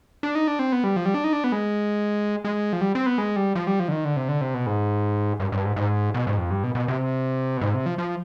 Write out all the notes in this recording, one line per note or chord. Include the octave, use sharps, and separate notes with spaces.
D4
D#4
D4
C4
B3
G3
F3
G3
D4
D#4
D4
B3
G#3
G#3
F3
G3
C4
B3
G#3
G3
F3
G3
F3
D3
D#3
D3
C3
D3
C3
B2
G#2
G2
G2
G#2
G#2
B2
G#2
F2
G2
B2
B2
C3
B2
G#2
C3
F3
F3